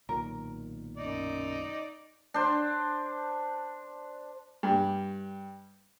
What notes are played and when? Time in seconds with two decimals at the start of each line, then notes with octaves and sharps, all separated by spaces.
0.09 B1 A#2 D#3 A#4
0.97 F#2 D#4 D5
2.34 D4 C5
4.63 G2